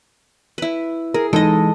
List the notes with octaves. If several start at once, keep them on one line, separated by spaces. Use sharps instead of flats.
E4 B4
G#4 A#4
E3 G#3 D#4 A4 D#5